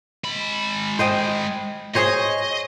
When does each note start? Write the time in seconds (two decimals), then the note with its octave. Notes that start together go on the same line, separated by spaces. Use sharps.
0.24 G#3 B5
0.99 C5 D#5 G5
1.95 G#4 C5 C#5 D#5